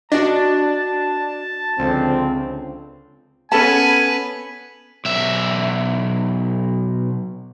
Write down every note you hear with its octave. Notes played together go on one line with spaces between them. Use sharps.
D4 F#4 D5 D#5 A5
C#2 D3 F3 C4
B3 C#4 A4 B4 G#5 A5
B1 E5